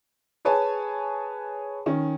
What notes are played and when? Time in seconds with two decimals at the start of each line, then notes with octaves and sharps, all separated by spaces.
0.45 G#4 B4 C#5 G#5 A5
1.86 D#3 C#4